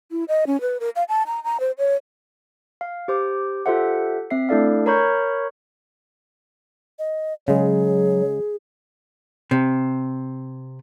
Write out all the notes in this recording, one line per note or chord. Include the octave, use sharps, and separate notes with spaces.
E4
D#5
C#4
B4
A#4
F5
A5
A#5
A#5
C5
C#5
F5
G4 C5 D6
F4 G4 A4 C5 E5 F#5
C4 E5 C7
A3 D4 E4 A4 D5 F5
A#4 C#5 A#5 B5 C#6 G6
D#5
C#3 F#3 G#3 G#4
C3